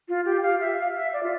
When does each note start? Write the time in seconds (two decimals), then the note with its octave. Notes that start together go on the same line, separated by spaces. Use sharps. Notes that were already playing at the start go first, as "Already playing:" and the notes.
0.09 F4
0.25 G4
0.43 F5
0.60 E5
0.78 F5
0.96 E5
1.13 D5
1.23 F4